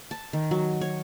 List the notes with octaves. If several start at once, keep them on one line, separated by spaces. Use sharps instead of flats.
A5
D#3
F#3
C#5